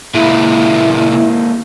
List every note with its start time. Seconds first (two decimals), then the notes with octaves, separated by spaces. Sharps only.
0.14 C#2 A#2 G#3 A#3 E4